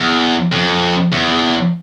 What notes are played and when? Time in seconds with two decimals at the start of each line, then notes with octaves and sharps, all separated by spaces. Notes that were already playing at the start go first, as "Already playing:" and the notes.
Already playing: E2
0.52 F2
1.12 E2